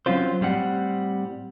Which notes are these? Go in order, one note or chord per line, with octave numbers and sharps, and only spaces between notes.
F#3 C4 C#4 F4 C5
A2 G3 C4 F#5